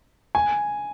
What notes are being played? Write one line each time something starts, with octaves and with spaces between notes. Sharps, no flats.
G#5